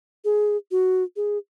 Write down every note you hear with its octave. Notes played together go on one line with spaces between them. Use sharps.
G#4
F#4
G#4